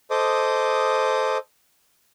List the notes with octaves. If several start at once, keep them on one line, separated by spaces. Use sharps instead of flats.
A4 C5 D#5 D6 D#6